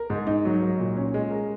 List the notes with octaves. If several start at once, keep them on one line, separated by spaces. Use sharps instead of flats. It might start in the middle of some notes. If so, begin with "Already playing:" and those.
Already playing: A#4
G#2
D#4
F#3
A#4
A#2
C#4
G#3
A#4